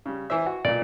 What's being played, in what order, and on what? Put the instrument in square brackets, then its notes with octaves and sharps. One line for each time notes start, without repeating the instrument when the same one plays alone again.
[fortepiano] C#3 G3
E3 C5 E5
F#4
[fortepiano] B1 A#2 [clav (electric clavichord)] D5